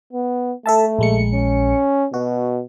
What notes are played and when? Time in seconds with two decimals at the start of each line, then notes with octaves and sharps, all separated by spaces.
0.13 B3
0.66 A3 A4 E5 A5
0.99 A#1 G#3 C#7
1.33 C#4
2.14 B2 F#4